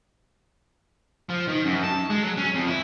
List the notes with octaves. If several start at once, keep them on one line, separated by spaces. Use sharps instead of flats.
F3
D#3
F#2
A5
G#3
F#3
C#4
F2
E4